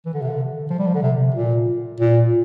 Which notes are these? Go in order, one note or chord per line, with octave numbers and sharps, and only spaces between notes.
E3
D3
C3
D3
F3
G3
F3
D3
C3
A#2
A#2